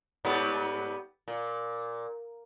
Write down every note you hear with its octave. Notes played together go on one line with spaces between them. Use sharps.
G#2 G3 B3
A#2